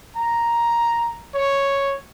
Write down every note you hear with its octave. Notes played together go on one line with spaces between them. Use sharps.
A#5
C#5